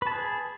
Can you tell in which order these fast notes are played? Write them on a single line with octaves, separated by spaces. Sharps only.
B4 A5 G#4